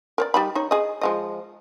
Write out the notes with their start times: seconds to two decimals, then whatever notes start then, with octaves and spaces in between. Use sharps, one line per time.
0.18 A#4 C#5 D5
0.34 G3 D#4 B5
0.55 D#4 C#5
0.71 G#4 D#5
1.01 F3 G#3 D#5